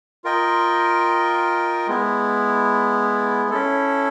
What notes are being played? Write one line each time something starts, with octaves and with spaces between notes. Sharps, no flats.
F4 A#4 D#5 G5
G#3 B3 E4
C#4 E4 A4